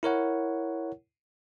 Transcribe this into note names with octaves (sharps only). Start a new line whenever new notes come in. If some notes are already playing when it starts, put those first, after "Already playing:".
E4 A#4 C#5 F#5